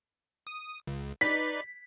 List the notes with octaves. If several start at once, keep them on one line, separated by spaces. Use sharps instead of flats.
D#6
C#2
D#4 B4 D5 B6